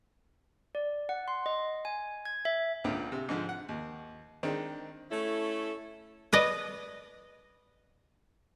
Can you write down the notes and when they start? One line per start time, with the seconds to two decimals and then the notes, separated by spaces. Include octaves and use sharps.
0.75 D5
1.09 F#5
1.28 C6
1.46 D#5
1.85 G#5
2.25 G#6
2.45 E5
2.84 C#2 A#2 D3 C4
3.12 C3
3.29 G#2 D3 F3
3.49 F#5
3.69 D#2
4.43 D#3 G#3 C4 D4
5.11 A3 C#4 E4 A4
6.33 B4 D5 D#5